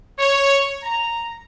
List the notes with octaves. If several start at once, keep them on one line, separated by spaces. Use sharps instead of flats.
C#5
A#5